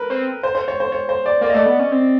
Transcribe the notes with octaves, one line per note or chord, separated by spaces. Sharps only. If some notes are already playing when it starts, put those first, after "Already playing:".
Already playing: A#4 B4
C4
C5
C5
C#5
C5
C#5
C5
D5
A#3 D5
D#5
A3 D5
B3
C#4
C4